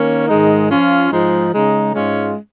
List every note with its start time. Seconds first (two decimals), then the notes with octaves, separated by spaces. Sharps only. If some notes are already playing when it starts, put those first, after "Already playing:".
Already playing: D#3 A#3 C#4
0.28 G#2 D#3 G#3 D#4
0.70 F3 C#4 F4
1.12 G#2 F3 G#3 D#4
1.53 C#3 G#3 D#4
1.95 G#2 G#3 C#4 F4